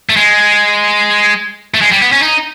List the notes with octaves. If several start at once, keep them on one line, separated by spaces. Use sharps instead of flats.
A3
G#3
A3
G#3
G3
B3
C#4
D#4